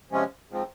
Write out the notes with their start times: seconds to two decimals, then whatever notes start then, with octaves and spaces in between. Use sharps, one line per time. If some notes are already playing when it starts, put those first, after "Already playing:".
0.11 C3 F3 G#3 C#4
0.49 G#2 F3 C4